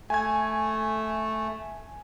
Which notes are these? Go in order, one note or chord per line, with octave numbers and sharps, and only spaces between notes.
A3 G#5 G#6